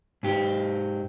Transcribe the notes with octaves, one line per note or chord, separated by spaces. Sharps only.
G#2 G4